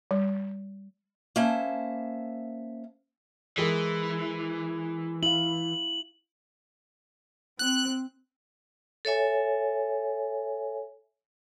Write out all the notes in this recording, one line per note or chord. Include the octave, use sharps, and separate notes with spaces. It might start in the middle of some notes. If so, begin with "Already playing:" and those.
G3
A#3 C#4 C5 E5 A5
E3 G#3 G#4 A#4
E4 F5 F#7
C4 F#6
A4 C#5 E5 G#5